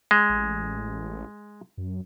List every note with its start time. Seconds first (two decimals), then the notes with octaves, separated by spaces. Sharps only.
0.11 G#3
0.29 A1
1.77 F#2